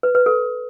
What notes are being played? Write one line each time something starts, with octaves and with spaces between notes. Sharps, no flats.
B4
B4
A4